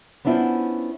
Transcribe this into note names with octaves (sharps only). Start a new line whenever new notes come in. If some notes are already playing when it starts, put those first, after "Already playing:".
B3 C#4 D4 E4 F4 C5